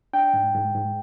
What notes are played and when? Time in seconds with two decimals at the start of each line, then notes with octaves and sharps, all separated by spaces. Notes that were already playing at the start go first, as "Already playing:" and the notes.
0.13 D4 G5
0.34 G#2
0.55 G#2
0.74 G#2